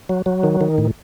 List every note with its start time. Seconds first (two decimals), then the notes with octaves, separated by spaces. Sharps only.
0.09 F#3
0.26 F#3
0.43 D#3
0.61 D#3
0.78 A2